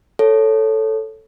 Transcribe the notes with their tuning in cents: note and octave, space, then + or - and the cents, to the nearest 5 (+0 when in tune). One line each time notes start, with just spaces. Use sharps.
A4 +0 C#5 +0